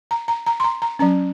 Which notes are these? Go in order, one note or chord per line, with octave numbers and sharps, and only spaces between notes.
A#5
A#5
A#5
C6
A#5
A#5
F#3 C#4 A#5